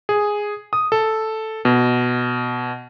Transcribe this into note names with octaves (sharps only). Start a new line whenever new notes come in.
G#4
D#6
A4
B2